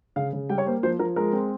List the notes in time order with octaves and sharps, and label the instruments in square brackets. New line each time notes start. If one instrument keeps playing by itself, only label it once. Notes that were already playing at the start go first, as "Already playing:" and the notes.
[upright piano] C#3 F5
C#3
G3 G5
C#5
A#3 C5
F3 C5
F3 A#4
G#3 A#4
C4